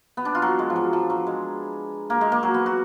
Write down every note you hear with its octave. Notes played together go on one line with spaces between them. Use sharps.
B3
D4
F4
F#3
G#3
F3
F#3
F3
F#3
G#3
A#3
G#3
A#3
F#3
B3
F#4